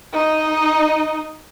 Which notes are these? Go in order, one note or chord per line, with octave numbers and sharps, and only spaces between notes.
D#4 D#5